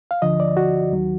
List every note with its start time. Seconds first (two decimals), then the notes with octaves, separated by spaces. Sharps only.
0.11 F5
0.22 D2 D3 F3 D#5
0.40 D5
0.57 F#4
0.92 D#2 D#3 F#3